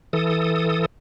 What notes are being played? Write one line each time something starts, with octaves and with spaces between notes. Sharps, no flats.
E3 A4 D#6